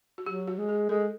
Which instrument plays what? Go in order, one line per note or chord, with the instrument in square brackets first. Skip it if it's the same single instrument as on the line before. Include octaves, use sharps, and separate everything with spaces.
[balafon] F#4
[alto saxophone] F#3 [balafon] G4
[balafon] F#4
[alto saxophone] G#3
[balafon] G#4
[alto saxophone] G#3 [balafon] A4